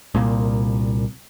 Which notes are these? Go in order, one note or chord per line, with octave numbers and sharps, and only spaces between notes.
C2 A#2 A#3